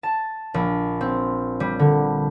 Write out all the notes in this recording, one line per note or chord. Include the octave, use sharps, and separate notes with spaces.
A5
A#1
C4
G3
D3